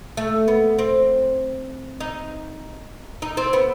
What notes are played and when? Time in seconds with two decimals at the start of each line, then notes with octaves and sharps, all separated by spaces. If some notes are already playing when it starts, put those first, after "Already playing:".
0.17 A3
0.48 B3
0.79 C4
2.00 D#4
3.22 D#4
3.37 C4
3.53 B3